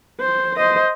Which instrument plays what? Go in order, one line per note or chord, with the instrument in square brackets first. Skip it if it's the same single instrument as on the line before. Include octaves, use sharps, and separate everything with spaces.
[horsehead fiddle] C5
C5 D#5